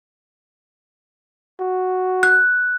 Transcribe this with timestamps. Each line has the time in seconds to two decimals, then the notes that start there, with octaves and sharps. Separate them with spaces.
1.59 F#4
2.23 F#6